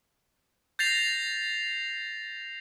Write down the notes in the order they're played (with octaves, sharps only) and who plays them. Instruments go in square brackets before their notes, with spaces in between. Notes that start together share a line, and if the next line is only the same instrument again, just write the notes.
[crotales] G6 A6 A#6 C7 F7